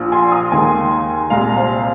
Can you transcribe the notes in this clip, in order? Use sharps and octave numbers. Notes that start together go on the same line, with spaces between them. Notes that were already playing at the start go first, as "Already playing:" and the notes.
Already playing: A#1 A#2 F3
G#5 C6
A#5 D#6
D#2 D#3 G#3 G#5 C6
C2 A#2 G#3 F5 A#5
C5 F5